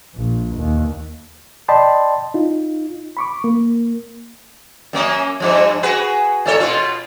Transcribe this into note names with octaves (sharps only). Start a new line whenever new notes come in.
A#1
D#2
D5 D#5 G5 A5 B5 C6
D#4 F4
B5 C#6 D6
A#3
F#2 A#3 C#4
G2 F3
F#4 G#4 B4
G#2 A4 C#5
B2 F4